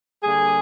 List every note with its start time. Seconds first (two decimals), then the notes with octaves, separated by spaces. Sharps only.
0.24 D3 G3 A#3 G#4